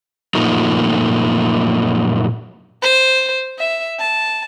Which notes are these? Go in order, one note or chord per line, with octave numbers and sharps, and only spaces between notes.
F#2 A#2 F3 A3 A#3 D#4
C5
E5
A5